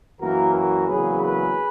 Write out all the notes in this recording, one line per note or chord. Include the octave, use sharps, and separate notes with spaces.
F#2 E3 A#3 F#4 A#4
F#4 A#4
E2 C#3 F#3 A#3 G#4 B4
G#4 B4